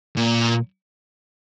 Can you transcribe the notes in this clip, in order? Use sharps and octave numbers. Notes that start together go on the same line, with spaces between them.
A#2